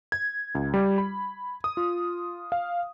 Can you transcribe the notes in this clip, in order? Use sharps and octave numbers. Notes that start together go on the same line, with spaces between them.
G#6
C#2
G3
B5
D#6
F4
F5